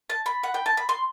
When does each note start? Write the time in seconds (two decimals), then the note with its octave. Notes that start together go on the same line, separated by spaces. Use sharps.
0.10 A5
0.26 B5
0.43 F#5
0.54 G5
0.66 A5
0.77 B5
0.89 C6